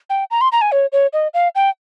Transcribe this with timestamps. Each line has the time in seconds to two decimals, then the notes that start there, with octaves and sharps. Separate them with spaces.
0.10 G5
0.31 A#5
0.41 C6
0.52 A#5
0.61 G#5
0.72 C#5
0.92 C#5
1.13 D#5
1.34 F5
1.55 G5